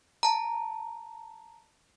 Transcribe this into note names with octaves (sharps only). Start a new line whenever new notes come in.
A5 A#5